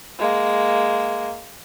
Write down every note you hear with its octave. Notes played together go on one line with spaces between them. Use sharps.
G#3 A#3